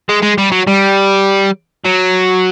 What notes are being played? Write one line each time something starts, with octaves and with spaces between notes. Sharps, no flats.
G#3
G#3
G3
F#3
G3
F#3